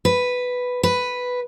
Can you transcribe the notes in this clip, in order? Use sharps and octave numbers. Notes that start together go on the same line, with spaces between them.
B4
B4